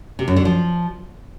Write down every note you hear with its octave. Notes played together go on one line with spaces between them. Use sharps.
C3
F#2
D3
F3